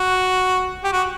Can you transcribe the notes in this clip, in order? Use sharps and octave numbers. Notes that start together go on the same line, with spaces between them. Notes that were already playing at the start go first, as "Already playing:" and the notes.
Already playing: F#4
G4
F#4